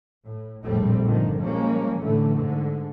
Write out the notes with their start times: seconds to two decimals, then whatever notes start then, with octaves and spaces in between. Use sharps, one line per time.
0.27 A2
0.65 F1 A#1 A2 G3 A3 C4
1.03 G1 A#2 D3 D#3 F3
1.40 F3 G3 G#3 A#3 C#4
2.01 A2 D3 E3 A3
2.36 G#2 D3